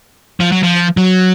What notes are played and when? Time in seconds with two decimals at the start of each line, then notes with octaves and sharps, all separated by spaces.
0.40 F3
0.52 F#3
0.63 F3
0.97 F#3